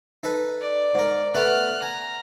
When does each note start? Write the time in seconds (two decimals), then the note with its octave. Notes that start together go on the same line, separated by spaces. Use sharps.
0.23 D#4 A4 B4
0.61 D5
0.95 G#2 A#4
1.35 A3 B3 A4 F6 F#6
1.82 G#5 A#5